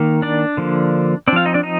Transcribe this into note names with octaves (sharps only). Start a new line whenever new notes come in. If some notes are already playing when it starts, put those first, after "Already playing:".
Already playing: D#3 A#3
D4 D5
D3 F3 A#3
C4 D4 D5
F3 F4 F5
D#4 D#5
D4 D5
D#4 D#5